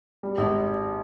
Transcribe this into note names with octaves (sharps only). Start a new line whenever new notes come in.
G3
G#1